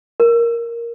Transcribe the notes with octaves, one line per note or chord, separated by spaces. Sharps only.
A#4